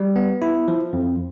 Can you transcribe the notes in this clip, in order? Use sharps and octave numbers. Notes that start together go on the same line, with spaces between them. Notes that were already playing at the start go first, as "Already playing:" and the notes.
Already playing: G3
B3
E4
F3
F2